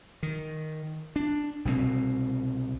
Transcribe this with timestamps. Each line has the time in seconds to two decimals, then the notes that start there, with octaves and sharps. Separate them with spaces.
0.23 D#3
1.16 D4
1.65 C2 B2 E3 C4